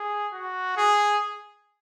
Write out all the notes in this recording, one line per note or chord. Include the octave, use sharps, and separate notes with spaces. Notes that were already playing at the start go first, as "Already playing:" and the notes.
Already playing: G#4
F#4
G#4